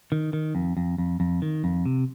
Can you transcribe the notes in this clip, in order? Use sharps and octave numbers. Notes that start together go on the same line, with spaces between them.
D#3
D#3
F2
F2
F2
F2
D#3
F2
C3